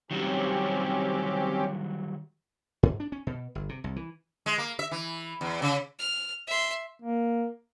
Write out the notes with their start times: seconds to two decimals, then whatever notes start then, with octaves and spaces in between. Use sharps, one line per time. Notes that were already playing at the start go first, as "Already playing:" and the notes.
0.11 D#3 F#3 G3 C4 C#4 G4
2.83 G#2
3.00 D4
3.12 C#4
3.27 B2
3.55 G1
3.69 C3
3.84 C2
3.96 E3
4.46 G#3
4.58 A#3
4.79 E5
4.91 E3
5.41 E2
5.62 C#3
5.99 F6
6.47 E5 C6
7.02 A#3